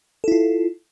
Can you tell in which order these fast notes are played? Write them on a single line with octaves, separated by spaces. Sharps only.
A4 E4 F4